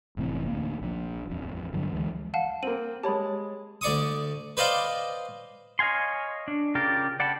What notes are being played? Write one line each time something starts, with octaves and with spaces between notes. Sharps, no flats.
F1 A2 E3 C4
D2 A#3
A#1 F3
D#1 A1 F2
G2 D3 F3 F#3
D2 E3 F3 G#3
F5 F#5 A5
A#3 C4 D#7 F#7
G#3 G4 C#5 A5 B5
D2 D5 C#6 D#6
B4 C5 D5 D#5 F5 G5
C#5 D#5 F5 G#5 C6
D4
C#3 F4 G4 A#4 D5
D5 F#5 G5 A5 B5